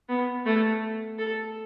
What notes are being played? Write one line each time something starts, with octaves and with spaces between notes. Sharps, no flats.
B3
A3
A4